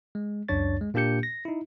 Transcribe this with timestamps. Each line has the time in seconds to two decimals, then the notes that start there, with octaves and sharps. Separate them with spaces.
0.15 G#3
0.49 C#2 F#2 D4 C#5 A6
0.81 G#3
0.94 A#2 A#3 D4 G4 G6 C#7
1.23 A#6
1.45 D#4 E4